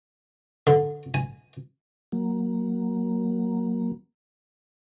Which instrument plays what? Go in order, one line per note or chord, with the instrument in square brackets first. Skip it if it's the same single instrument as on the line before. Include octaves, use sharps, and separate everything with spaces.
[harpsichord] D3
G#5
[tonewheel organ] F#3 A#3